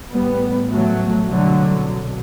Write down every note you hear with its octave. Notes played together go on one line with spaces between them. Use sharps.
A1 A2 G3 B3
F#3 A3
C2 B2 D3 F#3